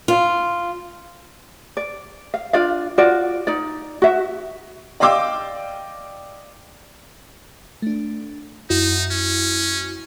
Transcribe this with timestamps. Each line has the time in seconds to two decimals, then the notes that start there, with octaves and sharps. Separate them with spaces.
0.08 F4
1.77 D5
2.34 F5
2.53 D4 F4 D5 F5
2.98 F4 F#4 D5
3.47 D#4 D5
4.02 F#4 E5
5.00 D5 D#5 F5 G5 D6 E6
7.82 A3 D4
8.70 F#2 D#4 E4 F#4
9.11 C#4